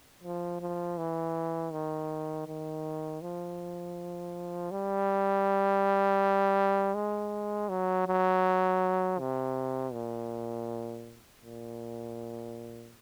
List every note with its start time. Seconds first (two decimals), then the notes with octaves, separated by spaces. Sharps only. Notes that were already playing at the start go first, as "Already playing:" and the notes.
0.23 F3
0.61 F3
0.98 E3
1.73 D#3
2.47 D#3
3.22 F3
4.71 G3
6.95 G#3
7.69 F#3
8.07 F#3
9.19 C3
9.93 A#2
11.43 A#2